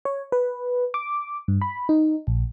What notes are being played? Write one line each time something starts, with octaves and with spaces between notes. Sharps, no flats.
C#5
B4
D6
G2
B5
D#4
A#1